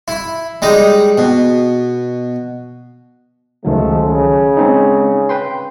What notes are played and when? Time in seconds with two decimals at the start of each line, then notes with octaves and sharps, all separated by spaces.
0.08 E4
0.62 G3 G#3 D#4
1.18 B2
3.65 C#2 D#3 F3 F#3 G#3 A3
4.04 C#3
4.57 G#3 C4 D#4
5.29 B4 G5 C6